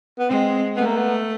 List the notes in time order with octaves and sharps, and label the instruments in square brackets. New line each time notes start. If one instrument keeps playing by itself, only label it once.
[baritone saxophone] B3
[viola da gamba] G#3 [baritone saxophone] C4
[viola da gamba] A3 [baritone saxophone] B3
[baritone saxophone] A#3
B3